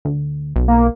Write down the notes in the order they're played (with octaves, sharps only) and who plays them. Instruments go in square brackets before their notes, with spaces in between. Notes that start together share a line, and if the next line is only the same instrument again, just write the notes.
[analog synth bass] D2
B1
[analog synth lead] A#3